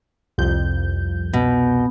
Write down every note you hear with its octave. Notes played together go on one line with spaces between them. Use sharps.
C2 F2 G6
B2